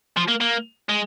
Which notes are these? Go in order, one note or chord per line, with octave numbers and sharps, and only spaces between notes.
F3
A#3
A#3
G#3